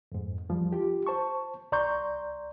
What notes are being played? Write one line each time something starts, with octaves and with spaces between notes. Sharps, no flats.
F2 G#2
E2 F3 G3
F4 G4
C5 A5 C#6
C2 D5 A#5 C6 C#6 G6